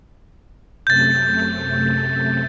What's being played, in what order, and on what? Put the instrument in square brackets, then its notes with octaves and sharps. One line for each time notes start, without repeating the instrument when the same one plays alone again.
[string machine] F#2 C3 A3 [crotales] G6 A6